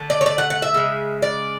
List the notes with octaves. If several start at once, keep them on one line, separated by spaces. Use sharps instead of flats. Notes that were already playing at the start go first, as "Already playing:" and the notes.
Already playing: D3 A3
D5
C#5
D5
F#5
F#5
E5
C#3 G#3
D5